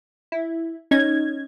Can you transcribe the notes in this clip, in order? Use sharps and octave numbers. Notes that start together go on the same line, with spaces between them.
E4
C#4 D#4 G#6